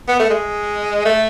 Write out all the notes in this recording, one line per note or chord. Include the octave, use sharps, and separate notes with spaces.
B3
A3
G#3
A3